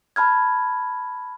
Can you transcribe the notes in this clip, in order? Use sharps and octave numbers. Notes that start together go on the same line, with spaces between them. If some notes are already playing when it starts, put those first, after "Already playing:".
A5 B5 F6 G#6